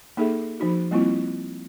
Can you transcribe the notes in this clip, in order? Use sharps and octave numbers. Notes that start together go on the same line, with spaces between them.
A#3 D#4 G#4 A4 E5
F3 D#4 F#4
G3 A#3 C4 E4 F4